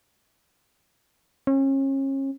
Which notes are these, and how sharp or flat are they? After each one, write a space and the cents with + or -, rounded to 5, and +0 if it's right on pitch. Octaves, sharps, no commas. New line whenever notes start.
C#4 -35